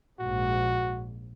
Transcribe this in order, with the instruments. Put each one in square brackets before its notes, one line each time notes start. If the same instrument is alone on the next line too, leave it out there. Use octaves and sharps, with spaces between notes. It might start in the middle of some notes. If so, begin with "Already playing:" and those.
[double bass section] A#1 G#2 [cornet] F#4